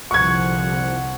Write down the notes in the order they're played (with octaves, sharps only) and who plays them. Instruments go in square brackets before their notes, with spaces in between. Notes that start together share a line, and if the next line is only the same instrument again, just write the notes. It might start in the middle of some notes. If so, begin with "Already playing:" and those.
[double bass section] C2 D3 F3 [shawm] F#5 [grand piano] C#6 G#6